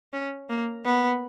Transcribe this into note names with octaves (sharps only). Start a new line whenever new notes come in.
C#4
A#3
B3